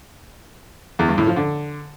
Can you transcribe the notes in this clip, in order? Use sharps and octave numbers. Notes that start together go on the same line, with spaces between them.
E2
G2
A2
F3
D3